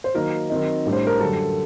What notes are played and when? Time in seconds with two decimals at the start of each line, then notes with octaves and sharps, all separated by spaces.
0.04 C5
0.14 D#3 F#3 A#3 D#4 A#4
0.50 D#3 F#3 C4 D#4
0.85 A2 G3 D4
0.93 C5
1.07 A#4
1.20 F#2 D3 G3 A4